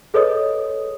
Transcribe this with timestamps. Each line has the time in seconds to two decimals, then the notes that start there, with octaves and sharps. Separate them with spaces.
0.14 G#4 A4 B4 C#5 D#5 D#6